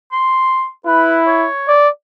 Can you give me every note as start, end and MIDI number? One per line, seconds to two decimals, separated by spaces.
0.12 0.66 84
0.86 1.48 64
0.86 1.17 71
1.27 1.73 73
1.68 1.89 74